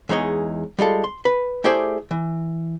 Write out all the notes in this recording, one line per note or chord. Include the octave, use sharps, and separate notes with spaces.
E2 G#3 D#4 C#5 D#5
G3 G#3 F4 A4
C6
B4
A3 E4 G4 G#4 C5 D5
E3